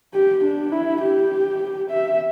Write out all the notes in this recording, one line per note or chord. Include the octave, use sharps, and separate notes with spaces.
G4
D4
E4
G4
E5